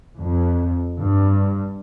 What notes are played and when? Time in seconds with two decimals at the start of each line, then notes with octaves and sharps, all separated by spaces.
0.20 F2
0.99 G2